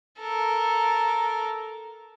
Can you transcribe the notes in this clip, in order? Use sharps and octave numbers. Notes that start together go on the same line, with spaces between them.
A4 A#4